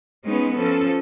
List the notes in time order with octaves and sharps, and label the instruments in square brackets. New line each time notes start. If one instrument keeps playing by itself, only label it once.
[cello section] G#3 B3 C#4 D#4
F3 C#4 A4